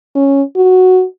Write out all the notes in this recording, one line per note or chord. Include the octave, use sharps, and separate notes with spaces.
C#4
F#4